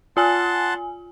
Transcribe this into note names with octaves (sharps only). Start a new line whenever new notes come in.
F4 F#5 G#5 A5 C6